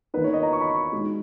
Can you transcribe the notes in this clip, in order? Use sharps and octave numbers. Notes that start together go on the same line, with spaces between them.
E2 D#3 A#3 D#4 B4
C#5
D#5
A#5
C#6
B5
C#6
B2 G#3 D#4